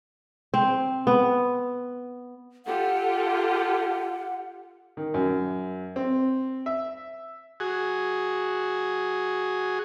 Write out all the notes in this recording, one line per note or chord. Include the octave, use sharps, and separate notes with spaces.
C4
B3
F4 G4 A4 F#5
D#3
F#2
C4
E5
F#4 G#4